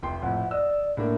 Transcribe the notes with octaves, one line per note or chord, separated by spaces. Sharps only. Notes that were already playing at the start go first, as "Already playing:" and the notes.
F1 G5 C6
F2 A2 F#5
D5 D#5 E6
A2 D3 A#3